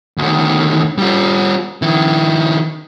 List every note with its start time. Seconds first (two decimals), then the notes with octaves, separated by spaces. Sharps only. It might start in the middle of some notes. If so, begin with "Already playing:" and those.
0.18 D2 D#3
0.98 G3 F4
1.82 D#3 E4